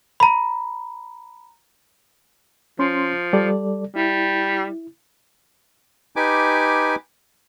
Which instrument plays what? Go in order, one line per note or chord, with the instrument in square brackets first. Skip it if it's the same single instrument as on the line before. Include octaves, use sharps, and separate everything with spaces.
[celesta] A#5 B5
[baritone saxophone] F3 [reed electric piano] C#4 C6
[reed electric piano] G3 A4 D5
[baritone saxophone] G3 [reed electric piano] E4
[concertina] D#4 G4 B4 G#5 D6